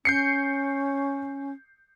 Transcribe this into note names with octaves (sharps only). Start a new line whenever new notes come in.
C#4 G6 C7 C#7